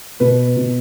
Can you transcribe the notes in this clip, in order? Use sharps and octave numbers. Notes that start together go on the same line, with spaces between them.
B2 B4
B2